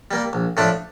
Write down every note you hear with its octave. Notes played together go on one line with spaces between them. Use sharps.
G3 A#3
A#1
A2 F3 A3 D4